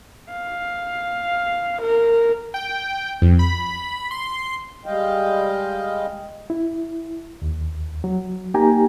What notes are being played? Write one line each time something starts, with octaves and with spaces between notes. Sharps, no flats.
F5
A#4
G5
F2
B5
C6
G3 G#3 D#5 F5 G5
E4
D#2
F#3
A#3 D#4 G4 G5 G#5 A#5